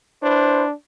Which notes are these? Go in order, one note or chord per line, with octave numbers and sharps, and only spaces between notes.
D4 E4 B4 C5